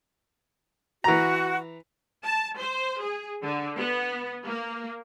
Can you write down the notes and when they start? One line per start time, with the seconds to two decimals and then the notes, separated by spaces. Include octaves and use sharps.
1.04 E3 F#4 A#5
2.24 A5
2.59 C5
3.02 G#4
3.42 D3
3.77 B3
4.45 A#3